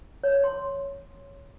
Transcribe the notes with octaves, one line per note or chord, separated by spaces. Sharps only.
C#5
C6